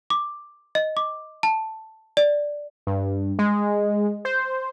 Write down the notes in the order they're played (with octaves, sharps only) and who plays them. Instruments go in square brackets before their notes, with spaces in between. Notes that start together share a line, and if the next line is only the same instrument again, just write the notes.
[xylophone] D6
D#5
D6
A5
D5
[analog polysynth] G2
G#3
C5